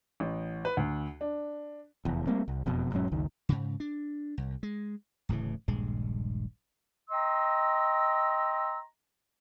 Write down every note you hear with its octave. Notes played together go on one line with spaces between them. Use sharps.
A1
B4
D2
D4
F1 E2
G3 A3 A#3 C4
C2
E1 F2 B2
E1 G#2 F#3 C#4
F#1 C#2 D#3
G#2 C#3
D4
C2
G#3
D1 A2 C#3 E3
D#1 A#1 G2 G#3
D#5 G5 A#5 C6 E6